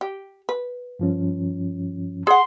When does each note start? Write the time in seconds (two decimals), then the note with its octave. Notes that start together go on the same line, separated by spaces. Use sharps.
0.01 G4
0.49 B4
0.99 G2 F3 C#4
2.27 G#4 F#5 C6